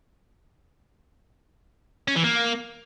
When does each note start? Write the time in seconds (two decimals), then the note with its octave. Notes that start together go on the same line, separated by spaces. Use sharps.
2.08 C#4
2.16 E3
2.24 A#3